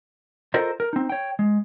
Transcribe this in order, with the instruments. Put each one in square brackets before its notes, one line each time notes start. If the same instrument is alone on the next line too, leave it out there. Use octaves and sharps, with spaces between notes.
[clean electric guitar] F4 A4 A#4 C5 D#5
A#4
C4 D#4
C#5 G5
G#3